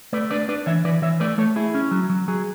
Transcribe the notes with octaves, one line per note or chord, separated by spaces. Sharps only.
A3 B4 D5
D4 B4 D5
D4 B4 D5
E3 C#5 E5
E3 B4 D5
E3 C#5 E5
A3 B4 D5
A3 A4 C#5
E4 G#4
C#4
F#3
F#3
F#3 G#4